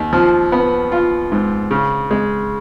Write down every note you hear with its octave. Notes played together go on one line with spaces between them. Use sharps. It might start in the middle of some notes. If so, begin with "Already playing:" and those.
Already playing: D#2
F3
B3
F4
G#2
C#3
G#3